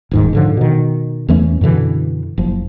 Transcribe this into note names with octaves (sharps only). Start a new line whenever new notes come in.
D#1 G#2 D#3
G#2 D3 F3
B2 D#3
E2 E3 A3 C#4
F#2 B2 D3 E3
F#1 F3